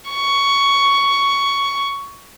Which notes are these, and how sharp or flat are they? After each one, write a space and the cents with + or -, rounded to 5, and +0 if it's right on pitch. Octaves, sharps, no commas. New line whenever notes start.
C#6 +10